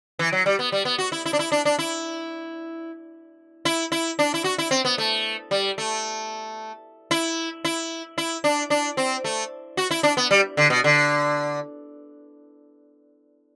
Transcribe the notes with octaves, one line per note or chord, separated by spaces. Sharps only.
E3
F#3
G3
B3
G3
B3
F#4
E4
E4
D4
E4
D4
D4
E4
E4
E4
D4
E4
F#4
E4
C4
B3
A3
G3
A3
E4
E4
E4
D4
D4
C4
A3
F#4
E4
D4
B3
G3
D3
B2
D3